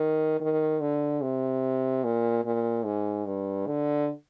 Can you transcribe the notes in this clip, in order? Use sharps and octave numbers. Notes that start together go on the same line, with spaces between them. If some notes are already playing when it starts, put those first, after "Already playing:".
Already playing: D#3
D#3
D3
C3
A#2
A#2
G#2
G2
D3